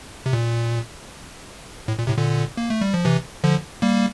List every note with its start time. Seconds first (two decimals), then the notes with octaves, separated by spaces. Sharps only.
0.26 C3
0.33 A#2
1.88 A2
1.99 A#2
2.07 A2 C3
2.17 A#2 D3
2.57 A#3
2.70 A3
2.81 G3
2.94 F3
3.05 C3 E3
3.44 D3 F3
3.82 G3 A#3